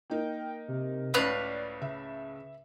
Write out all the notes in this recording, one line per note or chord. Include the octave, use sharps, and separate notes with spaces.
A#3 D#4 A#4 G5
C3
C#2 A2 B4 D5 F5 F#6
C#3 E5